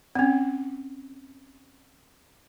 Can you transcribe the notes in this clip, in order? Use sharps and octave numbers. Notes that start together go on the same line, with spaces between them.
C4 C#4